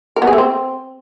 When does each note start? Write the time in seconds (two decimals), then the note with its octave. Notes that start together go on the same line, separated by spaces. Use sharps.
0.16 A#4
0.22 B3
0.27 G#4
0.33 A3
0.38 C4